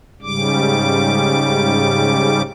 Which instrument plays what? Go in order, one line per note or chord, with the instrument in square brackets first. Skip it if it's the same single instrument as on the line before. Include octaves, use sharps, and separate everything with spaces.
[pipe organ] G#2 C#3 G3 D6